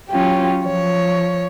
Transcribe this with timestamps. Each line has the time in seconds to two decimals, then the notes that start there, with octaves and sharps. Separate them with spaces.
0.10 F#3 C#4 F4 G4
0.65 F3 C#5